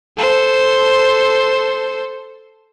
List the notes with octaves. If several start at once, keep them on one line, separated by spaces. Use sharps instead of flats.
A4 C5